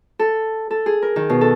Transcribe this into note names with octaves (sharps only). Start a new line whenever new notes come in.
A4
A4
G#4
A#4
D#3
B2
A4